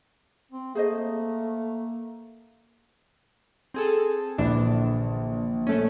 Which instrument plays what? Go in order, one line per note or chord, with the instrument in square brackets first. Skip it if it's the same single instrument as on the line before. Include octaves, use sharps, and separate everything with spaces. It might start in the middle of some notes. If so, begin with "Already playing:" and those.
[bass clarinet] C4
[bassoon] A3 [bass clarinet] A#3 [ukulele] G#4 C5 D#5
[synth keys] C4 G#4 A4
[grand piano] A#1 [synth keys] D3 E3 D4
[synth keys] A3 C#4